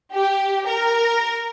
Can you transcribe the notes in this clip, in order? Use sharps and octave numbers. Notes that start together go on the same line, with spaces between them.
G4
A#4